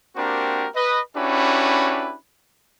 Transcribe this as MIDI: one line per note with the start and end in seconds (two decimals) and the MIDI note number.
0.16 0.66 58
0.16 0.66 60
0.16 0.66 62
0.16 0.66 66
0.16 0.66 67
0.16 0.66 70
0.75 1.00 71
0.75 1.00 75
1.16 2.14 61
1.16 2.14 62
1.16 2.14 64
1.16 2.14 66
1.16 2.14 67
1.16 2.14 71